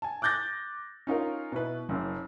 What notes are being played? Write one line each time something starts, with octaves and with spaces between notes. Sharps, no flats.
G#5 A5
D6 F#6 G6 A6 A#6
C#4 D#4 F4 A#4
B2 E4 B4
F#1 F#2